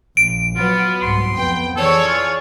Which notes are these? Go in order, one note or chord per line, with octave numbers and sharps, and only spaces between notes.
A#1 D7
F#3 B3 F4
C2 G#2 C6
F2 B3 G5
E3 G#4 A4 C#5 D5
F4